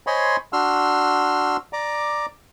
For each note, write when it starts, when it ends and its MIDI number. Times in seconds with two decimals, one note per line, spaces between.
0.07 0.37 72
0.07 0.37 73
0.07 0.37 75
0.07 0.37 80
0.07 0.37 83
0.07 0.37 84
0.53 1.57 62
0.53 1.57 66
0.53 1.57 84
0.53 1.57 88
0.53 1.57 89
1.73 2.26 74
1.73 2.26 82
1.73 2.26 86